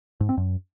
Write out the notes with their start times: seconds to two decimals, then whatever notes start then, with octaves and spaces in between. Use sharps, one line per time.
0.21 G#2
0.29 C4
0.37 F#2